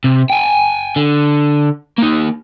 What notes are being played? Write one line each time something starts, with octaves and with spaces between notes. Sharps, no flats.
C3
G5 G#5
D3
A#3 D#4